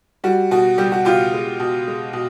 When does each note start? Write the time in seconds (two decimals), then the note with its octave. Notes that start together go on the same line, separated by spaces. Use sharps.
0.24 G3 F#4
0.51 B2 F#4
0.78 G3 G4
0.92 F#4
1.05 B2 F4 G4
1.33 G#3
1.59 B2
1.87 G#3
2.13 B2